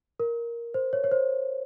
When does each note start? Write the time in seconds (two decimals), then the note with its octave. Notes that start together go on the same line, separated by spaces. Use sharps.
0.20 A#4
0.74 C5
0.93 C#5
1.04 C#5
1.12 C5